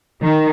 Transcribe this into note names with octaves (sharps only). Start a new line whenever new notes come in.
D#3